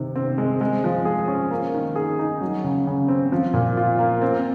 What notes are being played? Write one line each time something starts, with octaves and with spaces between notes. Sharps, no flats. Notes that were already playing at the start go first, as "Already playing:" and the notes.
Already playing: C3 D#3
C4
G#3
G#3
F3
G#4
C#4
A#3
D#3
G#4
D#4
F#3
C#3
C#3
C4
F3
A#2
F4
A#3
C4